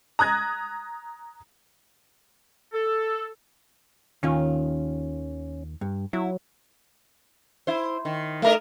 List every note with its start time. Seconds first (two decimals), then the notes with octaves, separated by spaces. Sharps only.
0.19 A#5 D#6 F#6 G#6 A#6
2.73 A4
4.23 D#2 D#3 C#4 F4
5.81 G2
6.13 F#3 E4
7.67 E4 C5
8.05 D#3
8.42 A3 A#4 D#5